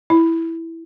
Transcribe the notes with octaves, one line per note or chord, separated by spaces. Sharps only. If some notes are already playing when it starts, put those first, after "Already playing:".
E4